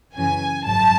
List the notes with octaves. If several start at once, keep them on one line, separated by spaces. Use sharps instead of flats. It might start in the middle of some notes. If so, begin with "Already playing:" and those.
F#2 C#3 E3 G#5
G#1 F#2 C#3 F#3 A5